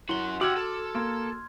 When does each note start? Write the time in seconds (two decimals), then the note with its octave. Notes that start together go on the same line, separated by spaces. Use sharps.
0.09 F#2 E4 F#4 C6 G7
0.41 F#4 G4 F#5 D6 E6 F6 G#6 F#7
0.56 A4
0.95 A#3 C6 G#6